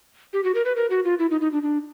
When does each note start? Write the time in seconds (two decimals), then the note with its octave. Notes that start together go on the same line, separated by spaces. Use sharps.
0.33 G4
0.44 F#4
0.55 A#4
0.65 B4
0.76 A#4
0.90 F#4
1.04 F4
1.19 E4
1.31 D#4
1.41 D#4
1.52 D4
1.63 D4